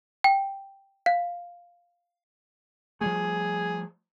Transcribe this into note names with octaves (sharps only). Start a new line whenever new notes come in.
G5
F5
F3 G3 A3 G#4